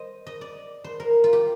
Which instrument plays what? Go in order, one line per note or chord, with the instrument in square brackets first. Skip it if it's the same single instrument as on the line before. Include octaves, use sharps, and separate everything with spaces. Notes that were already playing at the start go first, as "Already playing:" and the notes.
Already playing: [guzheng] C5 D#5
D#5
D5
C5
A#4
F4
G4